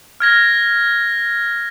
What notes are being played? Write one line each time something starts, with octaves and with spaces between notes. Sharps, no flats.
F6 G#6 A#6